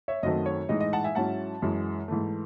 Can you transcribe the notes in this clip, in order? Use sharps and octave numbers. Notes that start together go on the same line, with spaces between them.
C#5 E5
F#2 D#3 F#3 A3 C4 D#5
C#5
A2 E3 G#3 D#4 D#5
D#5
F#5 A5
E5 G#5
G#2 F#3 C#4 E4 F#5 A5
F#2 E3 G#3
G#2 E3 A3